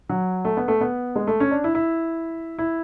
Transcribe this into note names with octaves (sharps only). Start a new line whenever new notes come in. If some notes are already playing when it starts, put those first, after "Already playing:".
F#3
A3
B3
A3
B3
G#3
A3
C#4
D4
E4
E4
E4